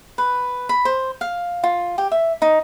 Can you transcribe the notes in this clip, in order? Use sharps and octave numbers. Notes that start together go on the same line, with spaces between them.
B4
B5
C5
F5
F4
G4
E5
D#4